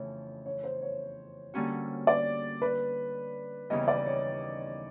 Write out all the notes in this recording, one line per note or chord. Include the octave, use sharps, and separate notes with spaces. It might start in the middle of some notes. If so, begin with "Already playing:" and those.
Already playing: F2 C#3 E3 A3 C#5
C#5
C5
C#5
D3 G3 A#3 C#4 F#4
D5
B4
D#2 C#3 E3 G3 B3 D#5
D5
C#5